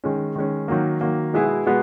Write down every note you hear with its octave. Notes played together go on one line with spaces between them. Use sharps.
D#3 G#3 C#4
D#3 G#3 C#4
D#3 F#3 A#3
D#3 F#3 A#3
B2 G#3 B3 E4 G#4
B2 G#3 B3